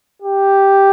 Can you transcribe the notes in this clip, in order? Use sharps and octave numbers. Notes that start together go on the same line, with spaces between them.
G4